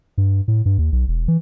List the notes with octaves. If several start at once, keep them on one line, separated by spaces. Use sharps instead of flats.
G2
A2
G2
D#2
B1
E1
E3